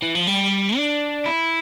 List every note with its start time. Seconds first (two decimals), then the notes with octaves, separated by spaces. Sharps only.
0.03 E3
0.15 F3
0.28 G3
0.77 D4
1.26 E4